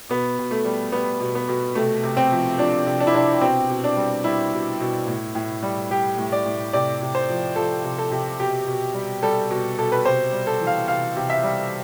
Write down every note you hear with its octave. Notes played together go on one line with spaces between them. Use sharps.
B2 B3
B2
A3
G3
G3 B3
B2
B3
B2
C3 A3
C3
C4
F3
F3 D4
C3
D4
E4
C3 D4
B2 C4
B2
D4
G3
G3 E4
B2
B2
A2
A2
G3
G3 G4
A2
D5
A2
C3 D5
C3
C5
F3
F3 A4
C3
A4
C3
B2 G4
B2
G3
G3 A4
B2
B2 A4
B4
C3 C5
G3
A4
E3
F5
C3 F5
C3
E5
G3